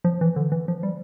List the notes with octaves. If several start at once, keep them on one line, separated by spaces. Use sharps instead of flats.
F3
E3
D3
E3
F3
G3